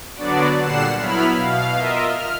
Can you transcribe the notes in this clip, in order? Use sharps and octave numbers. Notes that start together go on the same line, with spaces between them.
D3 F#3 B3 D4 F#4 D5
A#2 D3 G3 F#5 C7 E7
F#3 B3 E4 B5 F6
B2 F5
F4 A#4 D#5 E5
F6